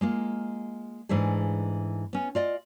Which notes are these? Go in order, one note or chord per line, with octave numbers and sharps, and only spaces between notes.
G#3 A#3 F4
G#2 E3 A3 D4 G#4
B3 C#4
F4 D5 D#5